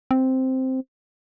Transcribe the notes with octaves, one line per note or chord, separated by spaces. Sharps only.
C4